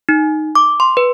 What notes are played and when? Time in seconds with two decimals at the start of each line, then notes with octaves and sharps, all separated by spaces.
0.09 D#4
0.55 D6
0.80 C6
0.97 B4